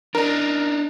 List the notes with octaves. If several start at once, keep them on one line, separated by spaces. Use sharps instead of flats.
D4 D#4 A#4